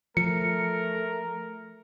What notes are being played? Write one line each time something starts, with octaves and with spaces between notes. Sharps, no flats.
F3 A3 A#4 C#7